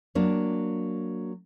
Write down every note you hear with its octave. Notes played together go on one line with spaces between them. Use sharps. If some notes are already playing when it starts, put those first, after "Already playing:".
F#3 A#3 D4